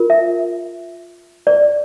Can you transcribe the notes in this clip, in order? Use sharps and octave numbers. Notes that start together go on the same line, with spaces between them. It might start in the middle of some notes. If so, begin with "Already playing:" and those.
Already playing: F4 A#4
E5
D5